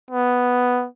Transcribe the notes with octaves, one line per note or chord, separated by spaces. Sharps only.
B3